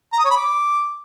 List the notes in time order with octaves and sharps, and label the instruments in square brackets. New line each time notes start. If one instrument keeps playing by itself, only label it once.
[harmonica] A#5
D#6
C#5
B5
D6